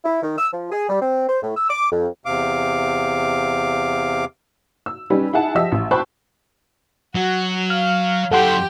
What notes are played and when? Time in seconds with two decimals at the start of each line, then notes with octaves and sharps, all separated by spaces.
0.05 E4
0.22 D#3
0.38 E6
0.52 F3
0.71 G#4
0.88 G3
1.01 C4
1.28 C5
1.42 A2
1.56 E6
1.69 D6
1.91 F2
2.26 E2 C3 F5 D6
4.86 E6
5.10 G3 C#4 D#4 B4
5.33 D#4 E4 G#4 F#5 A5
5.55 F3 G4 D#5 E5 E6
5.72 A1
5.91 C5 G5 A5 B5 C#6 F#6
7.15 F#3 F#4
7.70 F5 F6
8.31 F#2 E4 G4 A4 F#5 G5 C6